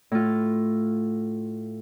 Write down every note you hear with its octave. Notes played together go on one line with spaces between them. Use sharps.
A2 F4